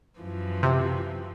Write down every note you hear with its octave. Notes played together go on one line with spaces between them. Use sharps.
F#2 E3 F3
C3